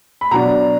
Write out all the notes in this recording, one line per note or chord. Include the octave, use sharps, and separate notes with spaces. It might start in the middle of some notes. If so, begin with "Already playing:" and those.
B5
B2 F#3 D4 A#5